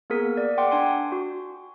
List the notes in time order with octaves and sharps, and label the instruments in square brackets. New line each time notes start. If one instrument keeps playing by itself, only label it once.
[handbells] A#3 B3 G#4 A#4 B6
D5
F#5 G5 C6 D6
D4 G#5 C6
F#4